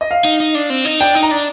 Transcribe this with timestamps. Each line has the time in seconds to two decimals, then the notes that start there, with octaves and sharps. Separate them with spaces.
0.01 D#5
0.11 F5
0.25 D#4
0.40 D#4
0.55 D4
0.70 C4
0.85 D#4
1.00 D4 G5
1.15 D#4
1.23 A#5
1.31 D4